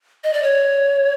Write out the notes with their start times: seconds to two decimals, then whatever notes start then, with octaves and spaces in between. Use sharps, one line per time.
0.24 D#5
0.33 D5
0.43 C#5